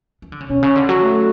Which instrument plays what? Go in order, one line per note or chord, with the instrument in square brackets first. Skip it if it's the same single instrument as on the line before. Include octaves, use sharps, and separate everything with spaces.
[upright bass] E3
D3
C#3
[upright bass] B2 [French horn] C#4
[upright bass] C#3
D3
F#3
[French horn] A3